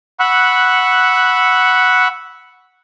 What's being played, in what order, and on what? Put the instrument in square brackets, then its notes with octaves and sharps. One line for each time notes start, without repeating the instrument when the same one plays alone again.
[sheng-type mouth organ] F#5 B5 C#6 E6 F#6